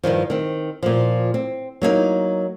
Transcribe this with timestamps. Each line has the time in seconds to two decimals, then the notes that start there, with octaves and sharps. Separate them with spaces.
0.03 G2 B2 D#3 F3
0.30 D#3 C4
0.83 A#2 F3
1.34 C4
1.82 F#3 A#3 B3 D#4